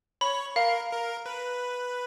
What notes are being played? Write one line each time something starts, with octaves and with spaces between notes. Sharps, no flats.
C#5 B5
A#4 F5
A#4
B4